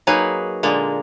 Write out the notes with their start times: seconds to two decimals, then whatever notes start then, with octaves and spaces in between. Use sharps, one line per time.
0.07 F#3 A#3 D#4 G#4 B4
0.63 A#2 D3 G#3 A#3